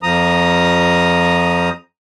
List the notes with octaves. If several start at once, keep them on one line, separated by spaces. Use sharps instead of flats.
F2 F3 A#5 D#6